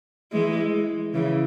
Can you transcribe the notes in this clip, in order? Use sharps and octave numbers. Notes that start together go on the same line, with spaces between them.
E3 G#3
C#3 E3